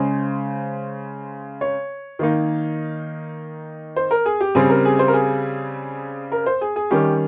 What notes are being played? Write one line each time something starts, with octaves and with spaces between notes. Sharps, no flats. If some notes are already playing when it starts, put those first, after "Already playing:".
Already playing: C#3 G#3 C#4 C5
C#5
D#3 A#3 D#4
C5
A#4
G#4
G4
C#3 G3 C4 G#4
A#4
G#4
C5
A#4
G#4
A#4
C5
G#4
G#4
D#3 G3 C#4 G4